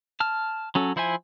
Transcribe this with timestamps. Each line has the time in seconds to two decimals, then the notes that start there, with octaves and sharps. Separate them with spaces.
0.20 A5 F6
0.75 F#3 C#4 A4
0.96 F3 E4 C5 E5 G#5